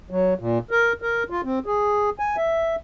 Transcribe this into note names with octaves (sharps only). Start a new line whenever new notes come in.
F#3
A#2
A#4
A#4
F4
C4
G#4
G#5
E5